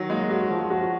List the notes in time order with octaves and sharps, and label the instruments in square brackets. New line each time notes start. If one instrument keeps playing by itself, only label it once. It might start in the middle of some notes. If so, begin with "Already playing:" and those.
Already playing: [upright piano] D#3 F#3
[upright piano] G#3 [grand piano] A#3
[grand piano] F#4
F3
F#4